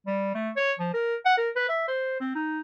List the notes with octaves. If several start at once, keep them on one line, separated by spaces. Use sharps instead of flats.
G3
A3
C#5
F3
A#4
F#5
A#4
B4
E5
C5
C4
D#4